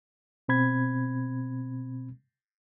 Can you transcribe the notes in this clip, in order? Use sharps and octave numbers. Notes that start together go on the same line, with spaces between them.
B2 C4 B5 G#6